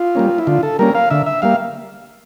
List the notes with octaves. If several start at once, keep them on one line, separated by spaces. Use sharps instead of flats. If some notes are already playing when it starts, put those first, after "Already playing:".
Already playing: F4
G3 A#3 C#4
E4
D3 F4
A4
G3 A#3 C#4 A#4
F5
D3 E5
E5
G3 A#3 F5